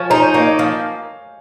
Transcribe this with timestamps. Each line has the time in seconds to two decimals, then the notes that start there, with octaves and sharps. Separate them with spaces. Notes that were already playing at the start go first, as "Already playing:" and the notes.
Already playing: F3 C#5 G#5
0.10 D#4 C5
0.22 C#5
0.34 A#3 C#5
0.47 D#5
0.59 F3 F5